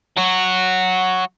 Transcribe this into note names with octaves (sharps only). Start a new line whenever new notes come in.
F#3 F#4